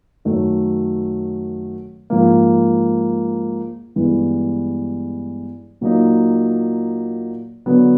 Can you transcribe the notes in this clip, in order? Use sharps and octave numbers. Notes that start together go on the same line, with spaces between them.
F#2 D#3 F#3 A3
G#2 F3 A#3
G2 E3 G#3 B3
A#2 F#3 A#3 D#4
D3 F#3 B3